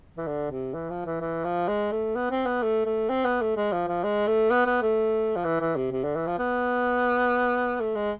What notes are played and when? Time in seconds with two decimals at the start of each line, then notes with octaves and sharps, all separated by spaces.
0.17 E3
0.27 D3
0.51 C3
0.74 E3
0.90 F3
1.06 E3
1.21 E3
1.45 F3
1.68 G#3
1.92 A3
2.16 B3
2.31 C4
2.46 B3
2.63 A3
2.86 A3
3.09 C4
3.25 B3
3.41 A3
3.57 G#3
3.72 F3
3.88 F3
4.04 G#3
4.27 A3
4.51 B3
4.67 B3
4.82 A3
5.36 F3
5.45 E3
5.60 E3
5.76 C3
5.92 C3
6.04 D3
6.16 E3
6.27 F3
6.39 B3
7.80 A3
7.96 G#3